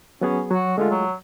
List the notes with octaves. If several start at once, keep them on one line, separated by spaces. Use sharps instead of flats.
F#3 B3 C#4 G#4
F#3 F#4
D3 G#3 A3 F4
F#3